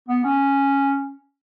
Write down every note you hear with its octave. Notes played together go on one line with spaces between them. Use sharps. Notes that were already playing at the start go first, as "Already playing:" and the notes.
B3
C#4